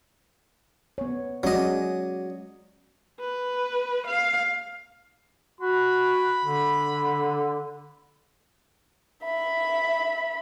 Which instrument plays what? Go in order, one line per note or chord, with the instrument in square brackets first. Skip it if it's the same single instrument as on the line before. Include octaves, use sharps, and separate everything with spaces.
[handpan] B3 C#5
[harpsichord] F#3 D#5 [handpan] G#3 C#4 D5
[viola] B4
F5
[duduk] F#4 [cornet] B5
[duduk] D3
[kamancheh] E5 B5